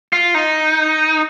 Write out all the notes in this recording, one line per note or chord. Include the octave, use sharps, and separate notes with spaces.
F4
D#4